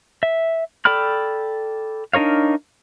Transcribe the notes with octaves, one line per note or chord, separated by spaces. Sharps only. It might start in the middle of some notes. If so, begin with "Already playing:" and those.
E5
A4 D5 G5 B5 F6
D4 D#4 A#4 C#5 F5